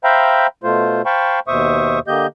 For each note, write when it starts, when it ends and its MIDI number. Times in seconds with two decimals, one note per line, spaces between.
0.04 0.47 72
0.04 0.47 76
0.04 0.47 77
0.04 0.47 79
0.04 0.47 82
0.04 0.47 83
0.64 1.02 47
0.64 1.02 57
0.64 1.02 65
0.64 1.02 72
1.06 1.40 72
1.06 1.40 77
1.06 1.40 79
1.06 1.40 81
1.06 1.40 83
1.06 1.40 85
1.48 1.99 39
1.48 1.99 47
1.48 1.99 72
1.48 1.99 76
1.48 1.99 85
1.48 1.99 87
2.07 2.27 50
2.07 2.27 58
2.07 2.27 67
2.07 2.27 75
2.07 2.27 91